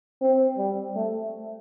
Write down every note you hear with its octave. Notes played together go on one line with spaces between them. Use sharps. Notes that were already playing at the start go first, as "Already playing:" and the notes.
C4
G3
A3